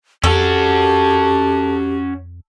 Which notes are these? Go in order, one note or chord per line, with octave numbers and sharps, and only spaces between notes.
F2 C#4 F#4 G4 A4